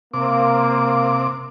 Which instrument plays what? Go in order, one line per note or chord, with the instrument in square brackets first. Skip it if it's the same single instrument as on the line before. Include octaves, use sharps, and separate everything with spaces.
[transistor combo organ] C3 D6 [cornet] A#3